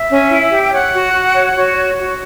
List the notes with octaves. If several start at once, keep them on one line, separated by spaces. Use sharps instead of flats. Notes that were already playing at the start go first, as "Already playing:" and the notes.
Already playing: E5
C#4
E4
G4
G5
C#5 F#5
F#4
F#4
C#5
F#4 C#5
C#5
F#4